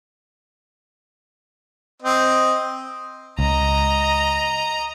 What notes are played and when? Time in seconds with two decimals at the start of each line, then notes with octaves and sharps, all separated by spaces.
2.02 C4 D#5
3.39 C#2 D#5 A#5